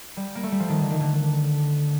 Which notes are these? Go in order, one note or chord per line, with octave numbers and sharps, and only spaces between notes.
G3
A#3
A3
G3
F3
D#3
D3
D#3
D3